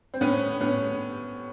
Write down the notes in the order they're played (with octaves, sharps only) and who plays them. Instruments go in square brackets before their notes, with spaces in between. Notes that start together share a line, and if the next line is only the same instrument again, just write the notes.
[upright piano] C4
A2 B3 C#4
A2 B3 C#4